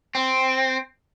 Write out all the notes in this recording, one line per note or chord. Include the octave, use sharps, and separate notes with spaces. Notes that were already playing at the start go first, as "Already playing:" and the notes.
C4